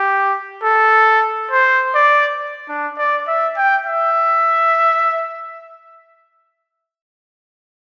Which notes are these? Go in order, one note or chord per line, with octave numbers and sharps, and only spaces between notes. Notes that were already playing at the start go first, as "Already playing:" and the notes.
Already playing: G4
A4
C5
D5
D4
D5
E5
G5
E5